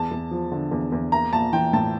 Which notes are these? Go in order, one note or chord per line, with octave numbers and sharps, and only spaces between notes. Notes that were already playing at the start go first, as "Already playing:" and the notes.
Already playing: E2 A5
E2
F3
D3
E2
E2
A#3 A#5
A#1 A5
E3 G5
A2 A5